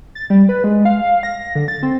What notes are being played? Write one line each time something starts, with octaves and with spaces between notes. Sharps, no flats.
A6
G3
B4
G#3
F5
A#6
D3
A6
C4